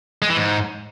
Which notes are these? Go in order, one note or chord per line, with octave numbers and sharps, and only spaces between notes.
G#3
E3
G#2